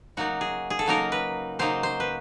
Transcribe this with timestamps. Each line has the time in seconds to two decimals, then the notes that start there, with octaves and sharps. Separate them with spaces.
0.17 C#3 F#3 A#3 D#4 F#4
0.41 G#4
0.70 G#4
0.79 A4
0.86 C#3 F#3 A#3 D#4 A#4
1.12 B4
1.59 C#3 F#3 A#3 D#4 C5
1.83 C5
2.00 B4